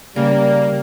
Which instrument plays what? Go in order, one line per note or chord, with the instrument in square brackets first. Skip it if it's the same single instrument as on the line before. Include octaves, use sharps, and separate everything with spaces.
[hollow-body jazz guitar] C#3 [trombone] G3 [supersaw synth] A#3